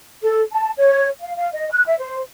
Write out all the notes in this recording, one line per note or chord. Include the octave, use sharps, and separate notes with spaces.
A4
A5
C#5
F5
F5
D#5
F#6
E5
C5